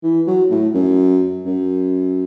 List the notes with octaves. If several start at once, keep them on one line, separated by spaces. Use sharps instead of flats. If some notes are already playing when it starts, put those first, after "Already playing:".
E3
F#3
A2
F#2
F#2